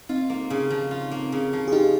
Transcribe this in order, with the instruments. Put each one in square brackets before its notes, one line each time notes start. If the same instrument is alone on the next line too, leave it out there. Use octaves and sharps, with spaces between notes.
[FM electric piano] C4 D#4 [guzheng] F4
[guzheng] A#3
C#3
F3
F4
A#3
C#3
F3
[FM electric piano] G#4
[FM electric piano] D#4 G4 [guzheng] F4